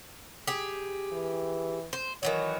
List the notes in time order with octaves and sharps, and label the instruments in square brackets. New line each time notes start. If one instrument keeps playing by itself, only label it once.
[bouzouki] G4 G#4
[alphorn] E3
[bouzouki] C5
[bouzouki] D#3 E3 F#3 [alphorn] C#5